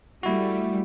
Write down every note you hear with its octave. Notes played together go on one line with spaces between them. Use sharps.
G3 A3 E4 F#4